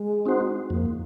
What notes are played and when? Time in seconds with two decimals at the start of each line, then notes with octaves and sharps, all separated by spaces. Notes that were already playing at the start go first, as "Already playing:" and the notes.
Already playing: G#3
0.26 C4 D#4 F#4 C5
0.70 F2 A#3